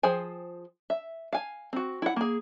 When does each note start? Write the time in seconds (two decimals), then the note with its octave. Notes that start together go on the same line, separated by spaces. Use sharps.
0.03 F3 G#4 C5 G5 G#5
0.90 E5
1.33 F5 G#5
1.73 C4 F#4
2.02 E4 F#5
2.16 A#3 G#4